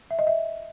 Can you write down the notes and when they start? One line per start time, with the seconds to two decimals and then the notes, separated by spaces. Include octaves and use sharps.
0.11 E5
0.19 D#5
0.27 E5